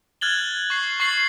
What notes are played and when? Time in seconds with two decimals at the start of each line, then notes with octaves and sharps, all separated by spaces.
0.21 F6 F#6 G#6 A6 F#7 G7
0.70 C#6 C7
1.00 C#6 A6 C7 F#7